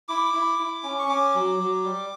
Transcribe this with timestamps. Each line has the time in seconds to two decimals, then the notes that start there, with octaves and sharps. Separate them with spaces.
0.09 E4 D6
0.34 E4
0.59 E4
0.83 C#4
0.99 C#6
1.09 C#4 D6
1.34 F#3
1.59 F#3
1.84 G3